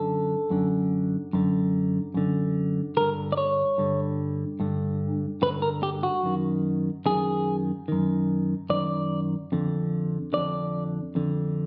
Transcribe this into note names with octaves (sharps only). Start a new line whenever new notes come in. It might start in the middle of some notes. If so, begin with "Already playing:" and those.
Already playing: F#2 D3 A4
F#2 D3
F#2 D3
F#2 D3
G2 D3 A#4
D5
C#5
G2 D3
G2 D3
G2 D3 B4
A#4
G4
F#4
F#2 D#3
F#2 D#3 G#4
F#2 D#3
F#2 D#3 D5
F2 D3
F2 D3 D5
F2 D3